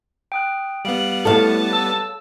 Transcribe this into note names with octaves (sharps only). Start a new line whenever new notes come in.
G5 D#6 F#6
G3 B3 F5 D7 F#7
A3 E4 A4 C#5 F5 A5
E6